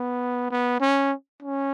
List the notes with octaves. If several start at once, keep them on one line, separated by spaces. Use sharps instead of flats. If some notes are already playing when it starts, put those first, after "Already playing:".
Already playing: B3
B3
C#4
C#4